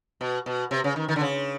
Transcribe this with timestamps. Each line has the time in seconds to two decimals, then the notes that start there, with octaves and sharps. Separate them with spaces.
0.21 B2
0.46 B2
0.71 C3
0.84 C#3
0.96 D#3
1.08 D#3
1.16 D3
1.21 C#3